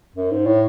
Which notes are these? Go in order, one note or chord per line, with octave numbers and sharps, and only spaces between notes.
F#2
G#2
A2